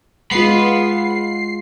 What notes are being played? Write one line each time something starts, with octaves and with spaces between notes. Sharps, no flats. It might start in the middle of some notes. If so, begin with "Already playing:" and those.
G#3 F4 F#5 B5 C7